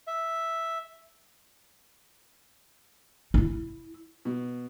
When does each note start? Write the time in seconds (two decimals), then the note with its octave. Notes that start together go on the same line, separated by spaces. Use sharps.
0.07 E5
3.34 D#4 E4
4.25 B2